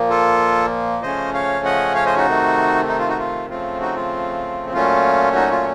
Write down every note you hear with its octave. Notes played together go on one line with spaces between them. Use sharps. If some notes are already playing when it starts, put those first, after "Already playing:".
Already playing: A#2 F3 A#3
F4 A4
C#3 F3 A3 C#4 C5 D#5
C#5 F5
D#5 F#5
C#5 F5
C5 D#5
D#4 F#4
C3 D#3 A3
D#4
F4
D#4 F#4
F4
C#3 F3 A3 C4 F4
D#4 F#4
F4
A#2 F#3 A3 C#4 F4
D#4 F#4
F4